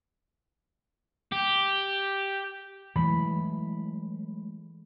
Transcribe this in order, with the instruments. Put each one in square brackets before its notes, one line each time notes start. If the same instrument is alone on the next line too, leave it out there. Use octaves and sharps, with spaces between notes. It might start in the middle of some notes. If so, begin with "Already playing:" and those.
[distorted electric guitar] G4
[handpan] E3 [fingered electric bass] F#3 G#3 A3 [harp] B5